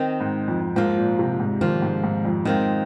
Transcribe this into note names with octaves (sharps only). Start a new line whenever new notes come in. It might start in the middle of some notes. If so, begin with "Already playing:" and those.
Already playing: D#3 C4 D#4
G#2
F2
G#2 F3 A#3 F4
A#2
C3
G#2
D#3 F3 A#3 F4
G#2
G#2
F2
G#2 D#3 C4 F4